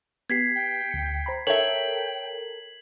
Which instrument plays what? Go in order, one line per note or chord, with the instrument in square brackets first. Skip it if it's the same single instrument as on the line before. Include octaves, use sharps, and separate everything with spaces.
[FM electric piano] B3 G4 [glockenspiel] G#6 B6 C7
[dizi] G5
[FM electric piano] D2 C#7
C5 A#5 B5
[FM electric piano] A4 A#4 [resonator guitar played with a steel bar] C#5 E5 [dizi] G5 [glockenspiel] F#7